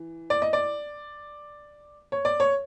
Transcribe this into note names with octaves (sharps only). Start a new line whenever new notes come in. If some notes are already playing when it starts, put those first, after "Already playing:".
Already playing: E3
D5
D#5
D5
C#5
D5
C#5